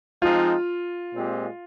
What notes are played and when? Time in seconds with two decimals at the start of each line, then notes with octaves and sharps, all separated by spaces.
0.22 F3 G#3 C4 D#4 F4
1.13 A#2 G#3 C4 G4